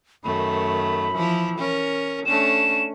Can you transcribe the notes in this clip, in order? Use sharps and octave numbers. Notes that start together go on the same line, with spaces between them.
F#2 D#3 A3 B5
E3 F3 E4
C#4 A#4
A3 C#4 D4 E7